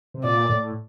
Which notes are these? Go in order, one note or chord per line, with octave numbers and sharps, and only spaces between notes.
C3
A#2 D5
A2